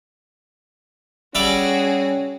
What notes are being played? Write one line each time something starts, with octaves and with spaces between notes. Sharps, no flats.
G3 C#4 F#4 G#4 E5 D6